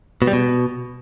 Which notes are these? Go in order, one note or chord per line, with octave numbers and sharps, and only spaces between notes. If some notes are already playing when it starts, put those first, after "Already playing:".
B2
G3
B2